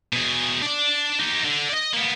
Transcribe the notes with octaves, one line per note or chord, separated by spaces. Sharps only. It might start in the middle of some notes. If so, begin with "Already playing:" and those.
B2 G#4
D4 D5
D#4 G4
D3
D5 D#5
A#3 B3